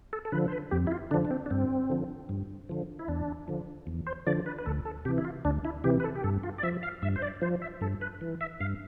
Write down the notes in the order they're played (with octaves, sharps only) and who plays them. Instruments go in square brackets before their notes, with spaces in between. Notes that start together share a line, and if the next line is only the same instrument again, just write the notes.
[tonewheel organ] A4
A4
D3 F3 B4
C5
B4
F2 G4
E4
F4
D3 D4
F3
D4
C4
D4
G2 C4
D3 F3
G2
D3 F3
E4
E2 D4
D3 F3
E2
C5
D3 F3 D5
B4
B4
D2 A4
A4
C3 E3 G4
E4
F4
D2 D4
E4
C3 E3 G4
B4
A4
G4
G2 A4
F4
D5
F3 E5
F5
G2 E5
C5
D5
F3 C5
E5
G2 A4
B4
E3
E5
G2 F5